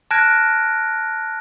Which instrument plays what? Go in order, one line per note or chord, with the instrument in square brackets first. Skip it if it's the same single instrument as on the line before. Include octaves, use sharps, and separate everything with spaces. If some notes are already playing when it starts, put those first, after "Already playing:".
[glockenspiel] A5 F6 F#6 G#6 A#6 D7